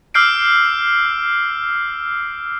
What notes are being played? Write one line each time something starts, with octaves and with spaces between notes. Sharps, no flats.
D6 E6 F6 G6 C7 D7